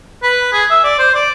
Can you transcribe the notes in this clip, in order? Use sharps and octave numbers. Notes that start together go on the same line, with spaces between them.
B4
G#4
E5
D5
C5
D5